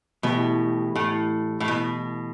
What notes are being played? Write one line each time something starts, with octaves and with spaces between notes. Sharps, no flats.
B2 E3 A3 E4 G4
A2
A2
B2